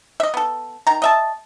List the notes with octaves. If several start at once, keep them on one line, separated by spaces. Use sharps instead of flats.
D#5 E5
B3 A4
D#3 A#5
D#5 E5 A5